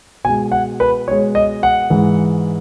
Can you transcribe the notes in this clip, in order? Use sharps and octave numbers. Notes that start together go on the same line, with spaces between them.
B2 G#3 G#5
F#5
B4
B2 G#3 C#5
D#5
F#5
G#2 E3 G#3